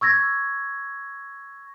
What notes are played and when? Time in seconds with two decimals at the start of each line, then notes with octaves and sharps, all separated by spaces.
0.01 C#6 E6 G#6 A#6